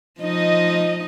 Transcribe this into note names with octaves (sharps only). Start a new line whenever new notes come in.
F3 D#4 D#5